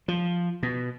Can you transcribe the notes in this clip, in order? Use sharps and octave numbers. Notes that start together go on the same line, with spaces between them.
F3
B2